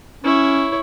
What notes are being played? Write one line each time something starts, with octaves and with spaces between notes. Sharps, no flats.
C#4 E4 C#5